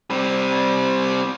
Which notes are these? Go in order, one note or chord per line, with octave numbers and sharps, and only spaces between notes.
G3 C4